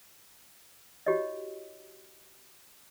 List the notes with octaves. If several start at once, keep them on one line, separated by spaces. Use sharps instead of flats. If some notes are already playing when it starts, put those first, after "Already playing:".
E4 F#4 G4 C#5 D#5